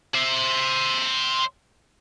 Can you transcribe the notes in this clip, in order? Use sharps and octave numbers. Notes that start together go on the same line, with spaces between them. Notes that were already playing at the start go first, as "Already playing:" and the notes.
C5 E5